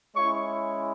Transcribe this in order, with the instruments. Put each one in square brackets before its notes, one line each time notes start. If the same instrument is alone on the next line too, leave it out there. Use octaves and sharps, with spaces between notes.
[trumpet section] G#3 C#4 E4 C#5 C#6